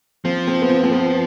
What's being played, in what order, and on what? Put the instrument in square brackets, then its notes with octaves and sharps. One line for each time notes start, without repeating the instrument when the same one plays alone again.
[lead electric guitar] F3 [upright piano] C4
[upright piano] C4
B3
C4
C4
B3